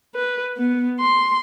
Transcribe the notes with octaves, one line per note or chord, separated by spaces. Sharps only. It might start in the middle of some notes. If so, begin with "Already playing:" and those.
B4
B3
C6